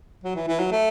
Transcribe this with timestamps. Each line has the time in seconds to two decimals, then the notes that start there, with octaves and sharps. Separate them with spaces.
0.24 F#3
0.36 E3
0.48 E3
0.59 F#3
0.71 A3